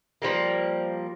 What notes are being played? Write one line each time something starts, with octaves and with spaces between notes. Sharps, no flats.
F3 G3 A#3